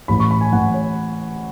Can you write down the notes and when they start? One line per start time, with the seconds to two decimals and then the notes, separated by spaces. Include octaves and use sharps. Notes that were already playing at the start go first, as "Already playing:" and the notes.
0.08 A1 A2 E3 B5
0.20 C#6
0.31 B5
0.41 G#5
0.52 A1 A2 E3 F#5
0.74 C#5